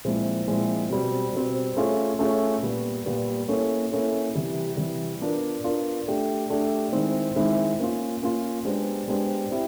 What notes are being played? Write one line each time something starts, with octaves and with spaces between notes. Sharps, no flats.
A#2 F3 G#3 C4 E4
A#2 F3 G#3 C4 E4
B2 G3 C4
B2 G3 C4
A3 C#4 F4 G#4 C#5
A3 C#4 F4 G#4 C#5
A#2 G3 B3
A#2 G3 B3
A#3 C#4 E4 A4 C#5
A#3 C#4 E4 A4 C#5
C3 E3 G3
C3 E3 G3
B3 D4 F4 A#4
B3 D4 F4 A#4
A3 D4 G4
A3 D4 G4
D#3 G#3 C4 E4
D#3 G#3 C4 E4
A#3 C#4 F4
A#3 C#4 F4
G#3 B3 D4 G4 C5
G#3 B3 D4 G4 C5
C4 E4 G4